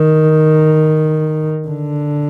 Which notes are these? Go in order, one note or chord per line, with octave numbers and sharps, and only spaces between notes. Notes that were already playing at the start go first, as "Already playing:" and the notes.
Already playing: D#3
D3